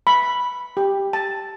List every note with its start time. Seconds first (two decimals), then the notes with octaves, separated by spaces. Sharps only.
0.07 B5
0.77 G4
1.13 A5